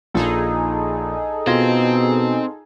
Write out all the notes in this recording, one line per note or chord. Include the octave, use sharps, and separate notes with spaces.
A#1 F3 D#4 G#4 A4
B2 C4 F4 G#6 A#6